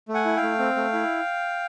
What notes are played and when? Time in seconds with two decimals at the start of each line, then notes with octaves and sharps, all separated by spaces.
0.08 A3
0.14 F#5 G#5
0.25 E4
0.37 F5 G5
0.42 A3
0.59 C4
0.76 A3
0.93 E4